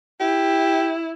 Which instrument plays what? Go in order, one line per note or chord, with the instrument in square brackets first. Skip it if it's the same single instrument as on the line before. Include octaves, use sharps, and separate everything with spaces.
[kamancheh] E4 [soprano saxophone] G4